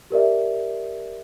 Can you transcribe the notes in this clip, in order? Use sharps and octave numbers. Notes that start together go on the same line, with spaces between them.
G4 A#4 D5 E5